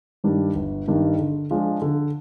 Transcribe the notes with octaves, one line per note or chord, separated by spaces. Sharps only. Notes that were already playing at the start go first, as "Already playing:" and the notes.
G2 D#3 G3 D4
G1
G2 D#3 G3 D4
D3
F3 G#3 D4 F4
D3